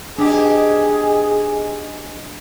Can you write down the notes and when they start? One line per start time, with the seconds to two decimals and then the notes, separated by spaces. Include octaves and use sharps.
0.18 B2 D4 D#4 G4 G#4